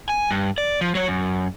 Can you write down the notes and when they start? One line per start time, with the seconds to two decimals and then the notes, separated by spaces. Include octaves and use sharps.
0.09 G#5
0.31 G2
0.58 D5
0.81 F3
0.95 F#3 C#5
1.08 F#2